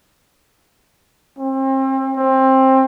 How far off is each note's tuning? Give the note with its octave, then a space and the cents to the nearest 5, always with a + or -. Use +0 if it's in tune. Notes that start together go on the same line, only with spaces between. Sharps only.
C4 +35
C4 +20